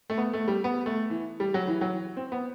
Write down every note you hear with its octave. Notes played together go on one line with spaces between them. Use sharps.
A3
B3
A3
G3
B3
A3
E3
G3
F#3
E3
F#3
C4
B3